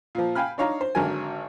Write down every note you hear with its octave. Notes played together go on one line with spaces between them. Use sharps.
A#2 F3
F5 G5 G#5 B5 F6
D4 D#4 C#5 F5 A#5
C5
G#1 D3 F#3 A#4 G#5